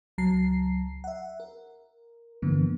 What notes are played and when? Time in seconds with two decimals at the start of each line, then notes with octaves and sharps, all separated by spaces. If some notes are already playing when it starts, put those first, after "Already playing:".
0.18 C#2 F#3 A5 A#5 C7
1.04 E5 F#5
1.40 A#4
2.42 G2 D3 E3 F3 A#3 B3